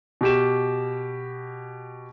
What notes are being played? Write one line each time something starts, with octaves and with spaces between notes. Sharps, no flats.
B2 G4 E7